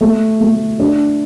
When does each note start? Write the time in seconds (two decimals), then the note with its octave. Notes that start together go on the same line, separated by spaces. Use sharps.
0.01 A3
0.40 A3
0.80 D4